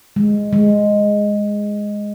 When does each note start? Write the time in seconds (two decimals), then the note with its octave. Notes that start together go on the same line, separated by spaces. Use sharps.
0.16 G#3
0.53 G#3